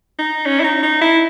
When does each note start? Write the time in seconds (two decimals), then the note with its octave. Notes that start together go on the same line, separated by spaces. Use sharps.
0.19 D#4
0.46 C#4
0.60 E4
0.64 D#4
0.83 D#4
1.01 E4